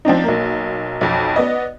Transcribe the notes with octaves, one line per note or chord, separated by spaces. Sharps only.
F3 C4 D4 D#4
B1 A#3
B1 F2
B3 D5 D#5